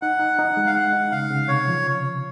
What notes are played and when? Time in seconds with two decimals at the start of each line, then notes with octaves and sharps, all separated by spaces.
0.02 D#4 F#5
0.19 D#4
0.39 D#4
0.57 G#3
0.66 F5
0.75 D#4 F#5
0.93 D#4
1.12 C#3 F5
1.30 C#3
1.48 C3 C#5
1.67 F3